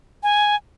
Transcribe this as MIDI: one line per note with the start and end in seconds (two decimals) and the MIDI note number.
0.23 0.56 80